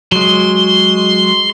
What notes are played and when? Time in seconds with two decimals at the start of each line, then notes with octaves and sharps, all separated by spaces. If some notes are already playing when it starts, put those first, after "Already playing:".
0.12 F#3 G#3 C6